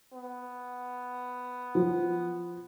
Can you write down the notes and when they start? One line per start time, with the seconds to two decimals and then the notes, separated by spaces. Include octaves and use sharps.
0.14 B3
1.75 F3